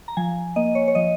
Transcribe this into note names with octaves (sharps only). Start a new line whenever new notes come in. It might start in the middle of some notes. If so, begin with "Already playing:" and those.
A#5
F3 G#5
A#3 D#5
C#5
C#5
F3 D#5